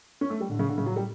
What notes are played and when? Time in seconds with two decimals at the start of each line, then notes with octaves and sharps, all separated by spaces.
0.21 C#4
0.30 A3
0.40 G3
0.49 A2 D3
0.59 C#3
0.69 D3
0.77 A2 C#3
0.86 F#3
0.96 G3